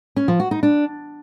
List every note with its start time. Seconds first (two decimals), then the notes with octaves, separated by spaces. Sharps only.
0.16 C#4
0.28 F3
0.40 F#4
0.51 D#4
0.63 D4